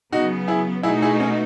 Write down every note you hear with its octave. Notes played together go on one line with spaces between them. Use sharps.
C#3 F#3 B3 D#4 F#4
E4 G#4
B2 A3 D#4 E4 F#4 G#4
E4 G#4
C#4